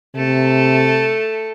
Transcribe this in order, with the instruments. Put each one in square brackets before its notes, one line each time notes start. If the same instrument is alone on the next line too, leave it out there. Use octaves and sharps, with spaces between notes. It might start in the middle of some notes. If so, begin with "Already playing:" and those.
[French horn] C3 [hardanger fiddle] A3 A4